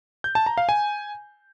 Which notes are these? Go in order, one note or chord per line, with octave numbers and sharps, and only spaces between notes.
G6
A5
A#5
F5
G#5